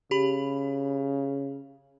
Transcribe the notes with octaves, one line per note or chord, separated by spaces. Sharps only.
C#3 G4 B5 F#7